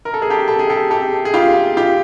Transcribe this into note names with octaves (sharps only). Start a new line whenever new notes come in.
A#4
A4
G#4
G4 A4
A4
G#4
G4 A4
G4 A4
G#4
F4 G4
F4 G4